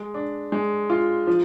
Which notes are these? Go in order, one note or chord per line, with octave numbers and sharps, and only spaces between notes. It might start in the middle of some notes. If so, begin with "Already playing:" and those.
Already playing: G#3
D4
G#3
F4
F3